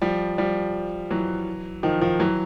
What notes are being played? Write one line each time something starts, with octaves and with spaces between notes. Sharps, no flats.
F3 G3
F3 G3
E3 F#3
D#3 F3
D#3 F3
E3 F#3